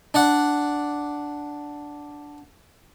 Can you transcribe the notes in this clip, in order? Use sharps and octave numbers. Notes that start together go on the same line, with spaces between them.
D4 D5 F#5